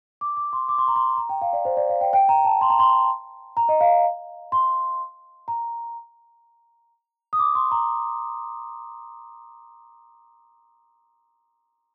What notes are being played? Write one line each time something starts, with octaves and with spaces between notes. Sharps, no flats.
D6
D6
C6
D6
C6
A#5
C6
A#5
G5
F5
D5
C5
D5
F5
G5
G5
A#5
A5
C6
A#5
C6
A#5
D#5
F5
C6
A#5
D#6
D6
C6
A#5